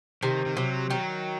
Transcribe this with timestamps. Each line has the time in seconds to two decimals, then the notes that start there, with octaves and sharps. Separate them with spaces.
0.23 C3 D#3
0.46 D#3
0.57 C3 F#3
0.90 D#3 F#3